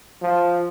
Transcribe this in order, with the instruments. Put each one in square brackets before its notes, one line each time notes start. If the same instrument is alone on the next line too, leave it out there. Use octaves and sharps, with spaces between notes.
[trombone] F3